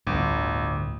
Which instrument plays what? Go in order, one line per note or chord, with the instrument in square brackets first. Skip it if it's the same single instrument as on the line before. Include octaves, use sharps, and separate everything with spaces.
[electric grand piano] G1 [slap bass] D2 A2